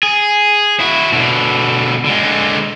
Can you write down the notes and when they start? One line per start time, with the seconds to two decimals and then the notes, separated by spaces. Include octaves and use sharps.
0.03 G#4
0.80 E4 F#4
1.13 B2 D3
2.05 D3 G#3